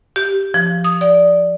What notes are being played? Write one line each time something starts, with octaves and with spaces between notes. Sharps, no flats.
G4
F3
D#6
D5